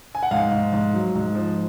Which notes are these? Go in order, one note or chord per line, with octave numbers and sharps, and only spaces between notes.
G#5
F#5
G#2 F5
G#2
G#2
F#3
G#2
F3